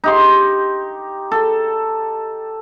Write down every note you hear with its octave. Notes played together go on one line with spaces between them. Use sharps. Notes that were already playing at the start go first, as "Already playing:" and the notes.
D#4 G4 C6
A4